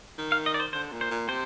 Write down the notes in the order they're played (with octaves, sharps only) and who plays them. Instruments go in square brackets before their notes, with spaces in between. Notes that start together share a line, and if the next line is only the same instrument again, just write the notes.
[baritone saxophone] D#3
[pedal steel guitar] F5
D#5
D5
C5
[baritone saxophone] D3 [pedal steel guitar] C5
[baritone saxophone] A#2
[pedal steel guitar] C5
[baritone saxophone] A#2
[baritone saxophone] C3 [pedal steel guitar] C5